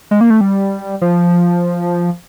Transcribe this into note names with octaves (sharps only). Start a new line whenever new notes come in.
G#3
A#3
A3
G3
F3